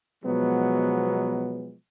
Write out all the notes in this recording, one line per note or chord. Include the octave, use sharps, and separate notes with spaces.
B2 F3 F#3 G#3 B3